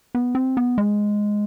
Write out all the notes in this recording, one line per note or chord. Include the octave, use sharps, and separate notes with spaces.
B3
C4
B3
G#3